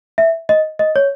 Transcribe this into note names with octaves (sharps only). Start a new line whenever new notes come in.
E5
D#5
D#5
C#5